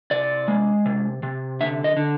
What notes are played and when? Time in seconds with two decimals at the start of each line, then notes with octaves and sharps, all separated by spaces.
0.11 C3 D5
0.48 G#3
0.86 C3
1.23 C3
1.61 D3 E5
1.84 D#5
1.97 D3